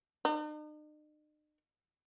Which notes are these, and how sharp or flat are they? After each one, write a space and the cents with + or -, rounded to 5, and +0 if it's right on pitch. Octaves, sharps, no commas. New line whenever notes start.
D#4 -45